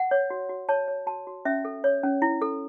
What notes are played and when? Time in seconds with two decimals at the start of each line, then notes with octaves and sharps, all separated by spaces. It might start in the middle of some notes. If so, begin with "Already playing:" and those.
Already playing: F#5
0.11 C#5
0.30 F#4
0.49 F#4
0.69 C#5 A5
0.88 C#5
1.06 F#4 A5
1.27 F#4
1.45 C#4 E5
1.65 A4
1.84 C#5
2.03 C#4
2.22 E4
2.42 A4